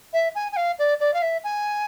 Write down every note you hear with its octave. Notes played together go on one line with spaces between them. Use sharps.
E5
G#5
G#5
F5
D5
D5
F5
E5
G#5